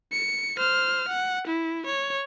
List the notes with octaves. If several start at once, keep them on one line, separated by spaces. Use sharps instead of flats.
C#7
C5 F6
F#5
E4
C#5